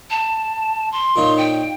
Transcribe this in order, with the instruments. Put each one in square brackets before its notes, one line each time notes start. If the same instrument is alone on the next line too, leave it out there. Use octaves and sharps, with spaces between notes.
[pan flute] A5
C6
[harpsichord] A#2 D#4 C#5
[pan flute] G5